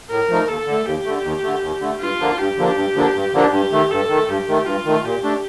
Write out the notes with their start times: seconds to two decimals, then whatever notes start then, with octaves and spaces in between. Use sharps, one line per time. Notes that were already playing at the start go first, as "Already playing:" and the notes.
0.10 A2 A#4
0.29 F3 A3 D#4
0.47 D#2 A4
0.66 D3
0.72 A3
0.86 D#2 G4
1.05 D3 A3
1.23 D#2
1.43 D3 A3
1.62 D#2
1.81 D3 A3
2.00 G2 F4
2.20 D3 F3 A#3 D4
2.38 G2 G4
2.58 D3 F3 A#3 D4
2.76 G2
2.95 D3 F3 A#3 D4
3.15 G2
3.34 D3 F3 A#3 D4
3.52 G2 G4
3.72 D#3 A3
3.90 G2 A4
4.09 D#3 A3
4.28 G2 G4
4.48 D#3 A3
4.66 G2 F4
4.85 D#3 A3
5.05 A#2 G4
5.23 A3 D4